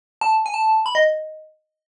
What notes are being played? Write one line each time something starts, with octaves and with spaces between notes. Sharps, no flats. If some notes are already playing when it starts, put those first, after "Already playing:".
A5
G#5
A5
B5
D#5